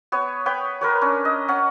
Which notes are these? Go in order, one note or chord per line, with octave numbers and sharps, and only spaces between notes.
B3 C#5
B4 C#5 G5 B5
A#4 B4 C#5
C#4 D4
D#5
C#4 F#5